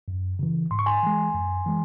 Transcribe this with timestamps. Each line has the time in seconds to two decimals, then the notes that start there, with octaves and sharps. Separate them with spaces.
0.08 F#2
0.39 C#3 E3
0.71 G#2 C6
0.79 C#6
0.86 G#5 C6
1.03 E3 G#3
1.35 F#2
1.66 E3 G#3